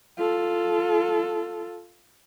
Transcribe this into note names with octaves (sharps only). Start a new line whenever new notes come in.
F4 A4